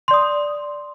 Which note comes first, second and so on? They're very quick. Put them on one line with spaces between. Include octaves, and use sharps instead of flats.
C6 D5 D#6